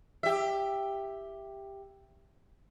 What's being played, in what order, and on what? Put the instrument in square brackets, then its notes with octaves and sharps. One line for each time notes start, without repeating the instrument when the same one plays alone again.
[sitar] G4 E5